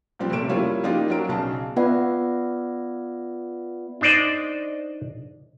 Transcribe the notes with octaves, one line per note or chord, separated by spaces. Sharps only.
A#2 F3 G3 C4 D4 G4
F#1 C3 A3 D7 E7
G3 A#3 C#4 E4 F4
F3 A#3 D4 D#4 F4 G4
F#3 C#4 D4 A#4 D7
B1 C#3 A5
B3 F4 B4 D5 E5 F#5
D4 D#4 C5 D5 D#5